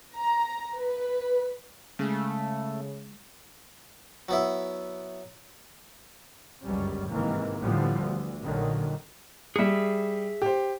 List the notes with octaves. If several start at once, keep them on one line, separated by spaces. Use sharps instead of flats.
A#5
B4
C#3 G#3 A3
F#3 B3 E4
G1 C#2 F#2 F#3 G3 C#4
G#2 C3 D#3 E3 A#3
A2 D3 E3 F3 G3 B3
D2
A#1 A#2 D3 D#3 F#3
G3 G#4 E5 C#7
G4 C5